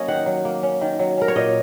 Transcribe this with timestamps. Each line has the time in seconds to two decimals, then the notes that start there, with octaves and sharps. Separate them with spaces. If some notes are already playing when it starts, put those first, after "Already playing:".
Already playing: F#3 A#3 C#4 C#5 D#5
0.08 D#3 F#5
0.26 F#3
0.45 A#3
0.63 C#4
0.81 D#3
0.99 F#3
1.18 C#4 A#4
1.28 C#5
1.36 A#2 D#5